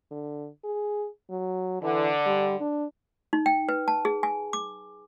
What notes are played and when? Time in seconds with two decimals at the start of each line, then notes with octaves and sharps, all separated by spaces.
0.11 D3
0.64 G#4
1.30 F#3
1.82 D3 E3
2.26 G3
2.60 D4
3.33 D#4
3.46 G5
3.69 B4
3.88 A5
4.05 G#4
4.23 G#5
4.53 D6